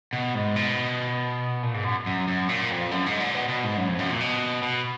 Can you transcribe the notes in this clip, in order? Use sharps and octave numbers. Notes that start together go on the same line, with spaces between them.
B2
G#2
B2
A#2
G#2
F#2
F#2
F#2
A#2
F2
F#2
G#2
A#2
B2
B2
G#2
F#2
F2
F#2
A#2
B2
B2